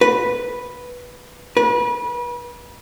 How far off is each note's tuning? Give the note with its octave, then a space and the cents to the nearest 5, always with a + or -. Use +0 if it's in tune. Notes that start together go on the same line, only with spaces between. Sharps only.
B4 -5
B4 -35